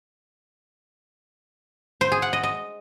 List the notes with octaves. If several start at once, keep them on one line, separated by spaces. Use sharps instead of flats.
C5
G#4
F#5
D#5
D#5